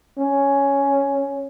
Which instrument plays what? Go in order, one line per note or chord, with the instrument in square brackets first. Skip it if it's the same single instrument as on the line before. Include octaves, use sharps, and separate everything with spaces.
[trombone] C#4